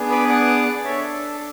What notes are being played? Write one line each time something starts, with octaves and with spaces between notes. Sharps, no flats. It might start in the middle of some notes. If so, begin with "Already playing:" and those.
Already playing: B3 D4 G#4
B4 D5
D5 F#5
D4 A4 C#5 E5